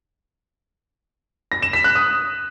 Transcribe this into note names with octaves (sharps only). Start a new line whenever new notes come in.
A#6
E7
B6
F#6
D#6